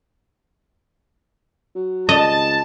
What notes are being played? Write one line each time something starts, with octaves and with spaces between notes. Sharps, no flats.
F#3
C#2 D#5 A5